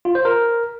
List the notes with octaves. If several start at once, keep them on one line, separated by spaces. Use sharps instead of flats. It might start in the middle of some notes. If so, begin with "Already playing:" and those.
F4
C5
A#4